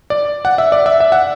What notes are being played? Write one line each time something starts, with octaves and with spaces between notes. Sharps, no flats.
D5
F#5
E5
D5
E5
E5
F#5